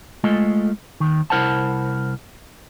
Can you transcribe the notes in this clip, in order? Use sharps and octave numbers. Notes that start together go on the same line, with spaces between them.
G#3 A3 F4 A4 D#5
D#2 D#3
C2 E4 A#4 C5 F#5 A5